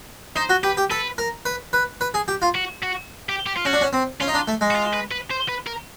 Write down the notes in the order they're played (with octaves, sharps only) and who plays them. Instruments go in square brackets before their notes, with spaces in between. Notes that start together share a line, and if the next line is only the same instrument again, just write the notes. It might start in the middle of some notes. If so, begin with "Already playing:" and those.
[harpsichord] D#4 [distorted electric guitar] C5
[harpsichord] F#4
[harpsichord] G4 [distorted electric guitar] B4
[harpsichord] G4
[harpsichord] A4 [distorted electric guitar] B4
[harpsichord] A#4
B4
B4
B4
G#4
G4
F4
[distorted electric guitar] F#4
F#4
G4
G4
F4
[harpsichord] C#4 [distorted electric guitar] F#4
[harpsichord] D4
C#4
C4
[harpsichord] C#4 [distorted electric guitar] F4
[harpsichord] D#4
D4
A3
G#3
[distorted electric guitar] F#4
F4
B4
B4
C5
B4
A#4